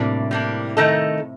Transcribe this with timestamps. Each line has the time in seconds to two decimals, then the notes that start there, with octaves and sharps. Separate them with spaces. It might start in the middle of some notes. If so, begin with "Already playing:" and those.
Already playing: A2 C3 G3 A#3 D4
0.31 G3 A#3 D4
0.77 D#3 A3 D#4 A4